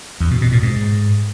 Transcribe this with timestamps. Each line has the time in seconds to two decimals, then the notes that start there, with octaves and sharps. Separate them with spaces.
0.20 E2
0.31 B2
0.41 B2
0.52 A#2
0.62 G#2